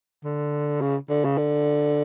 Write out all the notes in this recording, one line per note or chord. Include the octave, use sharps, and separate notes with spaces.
D3
C#3
D3
C#3
D3